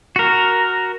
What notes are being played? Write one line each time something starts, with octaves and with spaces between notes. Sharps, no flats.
F#4 A#4